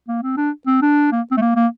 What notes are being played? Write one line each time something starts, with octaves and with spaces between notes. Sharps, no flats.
A#3
C4
D4
C4
D4
A#3
C4
A3
A#3
A#3